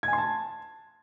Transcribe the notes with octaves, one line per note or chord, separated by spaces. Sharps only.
G#6
G#5
C6
A5